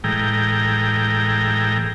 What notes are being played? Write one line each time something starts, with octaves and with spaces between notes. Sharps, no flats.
A2 E3 G#3 G5 A#5